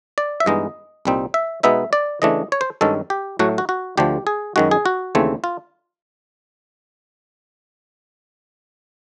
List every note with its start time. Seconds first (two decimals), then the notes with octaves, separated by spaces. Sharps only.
0.18 D5
0.40 E5
0.46 G2 E3 G#3 B3 D#4 D#5
1.05 C2 A#2 G3 C4 D#4
1.34 E5
1.63 B2 G#3 B3 D#4 E5
1.93 D5
2.22 C#3 E3 A3 D4 D#5
2.52 C#5
2.61 C5
2.81 G2 D#3 G#3 C#4 A4
3.10 G4
3.39 A2 F#3 A3 F#4
3.58 F#4
3.69 F#4
3.97 D2 D3 F3 A3 G4
4.27 G#4
4.56 F#2 D#3 G#3 F#4
4.71 G#4
4.86 F#4
5.15 D#2 C#3 E3 A3 C4
5.44 F4